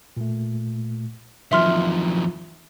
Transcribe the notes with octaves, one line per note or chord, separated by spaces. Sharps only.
A#2 A3
F2 D#3 E3 F#3 F4 E5 C6 F6